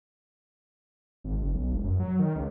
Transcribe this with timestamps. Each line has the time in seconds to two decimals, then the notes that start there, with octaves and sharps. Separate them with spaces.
1.24 G#1
1.41 F#1
1.55 B1
1.71 E1
1.84 F#2
2.00 F#3
2.19 D#3
2.36 C#2